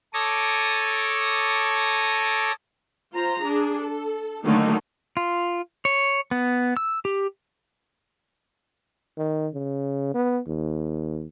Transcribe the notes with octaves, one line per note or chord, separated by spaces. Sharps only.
A4 C#5 D6 D#6 A#6
F4 C5 A#5
D4 G#4
A4
D3 D#3 F#3 A3 A#3 D#4
F4
C#5
B3
E6
G4
D#3
C#3
B3
D#2